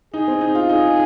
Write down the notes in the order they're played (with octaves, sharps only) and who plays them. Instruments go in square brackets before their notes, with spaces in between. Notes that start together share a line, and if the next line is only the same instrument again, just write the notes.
[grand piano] D#4 [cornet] G#4
[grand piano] C4
D#4
F4
[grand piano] D#4 [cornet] G#4